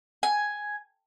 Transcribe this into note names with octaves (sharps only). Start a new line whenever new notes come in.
G#5